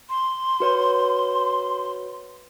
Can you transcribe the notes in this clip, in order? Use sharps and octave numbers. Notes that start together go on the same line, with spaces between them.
C6
F#4 B4 C#5